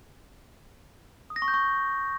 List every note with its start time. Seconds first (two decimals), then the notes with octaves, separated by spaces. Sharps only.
1.30 D#6
1.36 A#6
1.42 C#6
1.48 G6
1.54 C#6